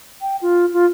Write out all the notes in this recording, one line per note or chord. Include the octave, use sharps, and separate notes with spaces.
G5
F4
F4